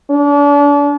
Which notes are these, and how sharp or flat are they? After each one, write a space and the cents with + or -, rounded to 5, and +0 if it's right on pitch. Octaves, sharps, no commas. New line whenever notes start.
D4 -35